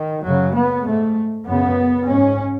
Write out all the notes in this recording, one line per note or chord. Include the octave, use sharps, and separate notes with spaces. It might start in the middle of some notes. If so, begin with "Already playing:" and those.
Already playing: D#3
F#2 C#3 F#3
B3
G#2 A3
F#2 C#3 B3
G#2 C#4